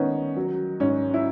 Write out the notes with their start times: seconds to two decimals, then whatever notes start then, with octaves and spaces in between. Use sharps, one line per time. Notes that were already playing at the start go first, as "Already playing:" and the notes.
Already playing: D#3 B3 C#4
0.36 F#3
0.80 G#2 C#4
1.14 E4